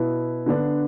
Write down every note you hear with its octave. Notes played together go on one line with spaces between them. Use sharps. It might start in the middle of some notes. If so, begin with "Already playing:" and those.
Already playing: B2 B3 E4
D3 B3 D4